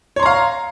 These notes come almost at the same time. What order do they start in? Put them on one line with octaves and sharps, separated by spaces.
C#5 C6 A#5 F5